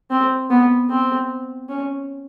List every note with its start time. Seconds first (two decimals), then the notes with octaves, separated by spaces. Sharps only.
0.11 C4
0.50 B3
0.90 C4
1.69 C#4